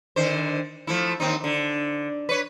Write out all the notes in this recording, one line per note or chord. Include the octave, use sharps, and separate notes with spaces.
D3 D#3 C5
F3 A3 E4
D#2 C4 D#4
D3
B4 C#5